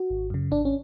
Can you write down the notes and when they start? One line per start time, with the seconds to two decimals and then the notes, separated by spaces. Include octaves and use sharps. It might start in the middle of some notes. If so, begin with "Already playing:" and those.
Already playing: F#4
0.10 G#1
0.30 F#2 C#3
0.51 G#1 D4
0.65 C#4